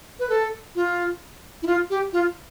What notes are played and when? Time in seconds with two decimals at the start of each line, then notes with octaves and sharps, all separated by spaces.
0.19 B4
0.29 A4
0.75 F4
1.63 E4
1.67 F4
1.90 G4
2.13 F4